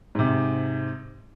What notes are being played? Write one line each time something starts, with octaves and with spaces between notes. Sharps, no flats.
G#2 C3